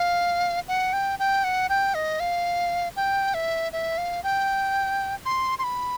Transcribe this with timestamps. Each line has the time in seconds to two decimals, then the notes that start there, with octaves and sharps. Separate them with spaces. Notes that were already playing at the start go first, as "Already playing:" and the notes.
Already playing: F5
0.68 F#5
0.93 G5
1.19 G5
1.44 F#5
1.69 G5
1.94 D#5
2.20 F5
2.96 G5
3.34 E5
3.73 E5
3.98 F5
4.24 G5
5.26 C6
5.59 C6
5.64 B5